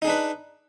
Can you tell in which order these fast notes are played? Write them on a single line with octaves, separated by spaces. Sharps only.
D#4 G#4 D4 B4